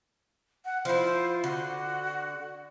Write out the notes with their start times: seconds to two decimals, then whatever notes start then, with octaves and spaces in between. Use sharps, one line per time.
0.65 F#5
0.85 F3 E4 C5
1.44 D3 F#4